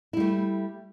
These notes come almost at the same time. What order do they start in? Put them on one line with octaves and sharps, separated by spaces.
E4 G3 A3